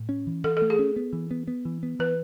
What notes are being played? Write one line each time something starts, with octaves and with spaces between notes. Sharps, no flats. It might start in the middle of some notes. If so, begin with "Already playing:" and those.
Already playing: A2
C#4
E3
E3 A4
A4
A3
G#4
C#4
B3
E3
B3
B3
E3
B3
E3 B4